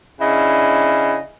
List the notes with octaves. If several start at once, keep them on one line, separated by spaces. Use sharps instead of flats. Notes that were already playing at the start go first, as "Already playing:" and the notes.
C#3 D4 E4 D#5 F5